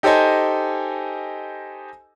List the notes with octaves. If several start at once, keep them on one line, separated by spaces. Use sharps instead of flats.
D#4 G4 A4 C5 D#5 G#5